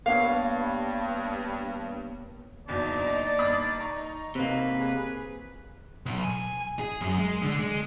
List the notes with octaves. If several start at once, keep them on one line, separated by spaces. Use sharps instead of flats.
G2 A#3 B3 C#5 F5
F#1 E2 B2 A#3 D4 D#4 D5
G1 B5 D#6
D#4 A#5 C#6
C3 A#3 B4
G#4
B1
G#5
G#4
F#2
G#3
D3
G#3